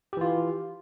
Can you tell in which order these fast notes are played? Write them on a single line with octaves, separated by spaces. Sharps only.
G4 E3 F4